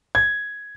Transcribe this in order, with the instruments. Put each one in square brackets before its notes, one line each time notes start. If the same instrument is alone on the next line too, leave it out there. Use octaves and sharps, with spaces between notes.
[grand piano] G#6